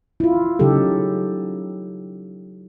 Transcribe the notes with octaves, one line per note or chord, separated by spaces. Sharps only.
E4 F4
C#3 F#3 D#4 G4 A4